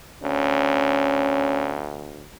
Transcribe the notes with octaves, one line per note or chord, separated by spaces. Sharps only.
D2 C#4